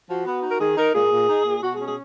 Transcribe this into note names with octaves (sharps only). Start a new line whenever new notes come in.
F3 F#4
B3
D#4
A#4
D#3 G#4
D#4 A#4
A#2 G#4
A#2
D#4
A#2
B2 F#4
G#4
C#4
G#4